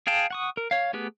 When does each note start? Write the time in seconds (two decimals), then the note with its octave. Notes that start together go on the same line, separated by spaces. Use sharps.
0.07 G#4 F5 G5 A5
0.31 F#5 C#6 D#6
0.57 A#4
0.71 C#5 F5
0.93 A3 B3 G4 G#4 B4